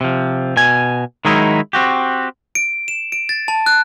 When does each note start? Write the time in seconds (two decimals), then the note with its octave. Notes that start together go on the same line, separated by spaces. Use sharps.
0.01 C3 F3
0.57 B2 G#5
1.25 D#3 F#3 G#3 D#4 E4
1.73 C4 F#4 G4
2.55 D7
2.88 E7
3.12 D7
3.29 A6
3.48 A5
3.66 F#6